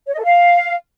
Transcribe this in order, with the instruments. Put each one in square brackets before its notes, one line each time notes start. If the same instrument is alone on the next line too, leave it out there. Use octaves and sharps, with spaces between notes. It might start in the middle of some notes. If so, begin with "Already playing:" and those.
[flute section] C#5
D#5
A4
F5